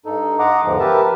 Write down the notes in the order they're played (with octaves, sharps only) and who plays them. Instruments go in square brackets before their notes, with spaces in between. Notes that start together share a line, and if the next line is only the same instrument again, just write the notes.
[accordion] G2 D#4 A4
D#5 F#5 A#5 C6 D6
E2 G#2 D3 E3 F3
G4 A#4 B4 E5 A5